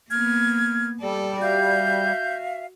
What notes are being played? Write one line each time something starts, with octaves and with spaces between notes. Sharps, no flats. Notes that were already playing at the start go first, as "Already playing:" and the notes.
A#3 B3 F6 G#6
G3 A4 D5
F#4 E5 F5 G6